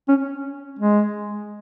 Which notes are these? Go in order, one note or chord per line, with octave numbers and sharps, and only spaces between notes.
C#4
G#3